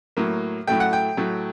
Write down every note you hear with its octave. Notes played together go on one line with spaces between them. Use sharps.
A2 F#3 A#3
A2 F#3 A3 G5
F#5
G5
A2 F#3 A3